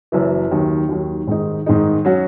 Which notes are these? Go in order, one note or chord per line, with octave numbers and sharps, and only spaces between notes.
F#1 F#2 E3
D#2 D#3 F#3
D#2 D#3 F#3
G#2 D#3 G#3 D#4
G#2 D#3 G#3 D#4
F#3 C#4 F#4